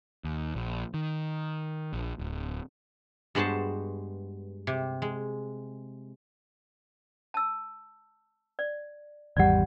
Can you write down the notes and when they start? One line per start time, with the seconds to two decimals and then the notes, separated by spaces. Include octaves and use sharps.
0.24 D#2
0.55 A#1
0.94 D#3
1.93 A#1
2.19 D1
3.35 G2 G#3 B3 F#4 C5 A5
4.67 C3
5.02 G#3
7.34 A5 E6
8.59 D5
9.37 G#1 E2 G3 D5 F#5